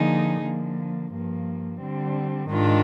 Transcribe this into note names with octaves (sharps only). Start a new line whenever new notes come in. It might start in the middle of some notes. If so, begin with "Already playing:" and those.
Already playing: D3 F3 A#3 D#4 G#4
D3 F3 A#3
G2 F3 A#3
D3 G3 C4
G#2 D#3 G#3 D4 F4